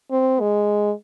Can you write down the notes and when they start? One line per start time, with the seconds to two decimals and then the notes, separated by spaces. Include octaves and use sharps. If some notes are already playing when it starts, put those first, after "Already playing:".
0.11 C4
0.40 G#3